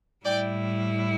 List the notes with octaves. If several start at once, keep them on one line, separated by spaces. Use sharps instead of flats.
A2 G3 E4 D5 G5